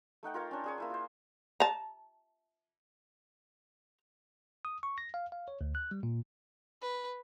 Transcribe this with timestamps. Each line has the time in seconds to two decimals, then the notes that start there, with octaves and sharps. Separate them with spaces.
0.23 A3 D#4 F#5 G5
0.34 F4 A#4 C#5 F5
0.51 C#4 D4
0.64 D4 G#4 C#5
0.78 A#3 E4 C5
0.90 F4 C5
1.60 A5 A#5
4.65 D#6
4.83 C#6
4.98 A#6
5.14 F5
5.32 F5
5.48 C#5
5.61 D2
5.75 F#6
5.91 G3
6.03 A#2
6.82 B4